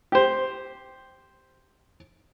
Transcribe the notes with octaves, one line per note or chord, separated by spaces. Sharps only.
G4 C5